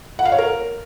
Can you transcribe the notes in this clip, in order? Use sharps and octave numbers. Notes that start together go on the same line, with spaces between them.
F#5
F5
C#5
A#4